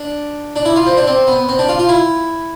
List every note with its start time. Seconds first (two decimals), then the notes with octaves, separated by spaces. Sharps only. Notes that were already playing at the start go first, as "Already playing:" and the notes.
Already playing: D4
0.56 D4
0.65 E4
0.76 F4
0.86 C4
0.97 D4
1.07 C4
1.27 B3
1.49 C4
1.59 D4
1.69 F4
1.79 F4
1.89 E4